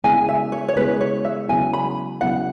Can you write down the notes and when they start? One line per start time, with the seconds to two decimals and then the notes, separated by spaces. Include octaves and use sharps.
0.04 C#3 G#3 B3 E4 G#4 G#5
0.29 E5
0.52 C#5
0.68 C#5
0.76 C#3 G#3 B3 E4 G#4 B4
1.01 C#5
1.25 E5
1.48 C#3 F#3 B3 E4 G#5
1.73 B5
2.21 C#3 F#3 B3 E4 F#5